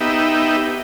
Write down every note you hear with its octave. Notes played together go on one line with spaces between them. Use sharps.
B3 D#4 G4 E5